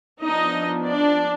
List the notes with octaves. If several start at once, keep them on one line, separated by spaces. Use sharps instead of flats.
F3 B3 D4 D#4 D#5
D4 D5